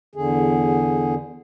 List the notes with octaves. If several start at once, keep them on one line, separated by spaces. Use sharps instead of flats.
E2 D3 G#4